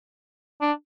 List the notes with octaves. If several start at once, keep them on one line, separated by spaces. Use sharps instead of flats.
D4